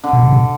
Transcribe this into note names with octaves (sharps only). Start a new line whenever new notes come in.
D3
B2
C3
B2